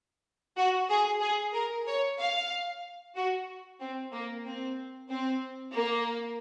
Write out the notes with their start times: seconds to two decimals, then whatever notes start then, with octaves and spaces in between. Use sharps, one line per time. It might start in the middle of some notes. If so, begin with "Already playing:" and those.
0.57 F#4
0.89 G#4
1.21 G#4
1.53 A#4
1.87 C#5
2.19 F5
3.16 F#4
3.80 C4
4.12 A#3
4.45 C4
5.09 C4
5.74 A#3